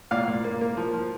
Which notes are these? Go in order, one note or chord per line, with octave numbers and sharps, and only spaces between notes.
A#2 D5 F5
A#2
A#3
A#3
F3
F3